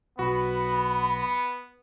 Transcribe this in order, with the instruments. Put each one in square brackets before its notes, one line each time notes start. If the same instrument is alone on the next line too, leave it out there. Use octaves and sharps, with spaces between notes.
[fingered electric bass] B1 [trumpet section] B3 [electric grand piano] F#4 [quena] B5